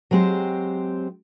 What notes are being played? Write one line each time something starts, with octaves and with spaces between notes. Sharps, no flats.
F#3 G#3 C4 G4 C5